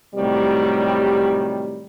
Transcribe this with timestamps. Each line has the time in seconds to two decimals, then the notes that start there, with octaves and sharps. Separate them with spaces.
0.15 A2 C3 D#3 F#3 G3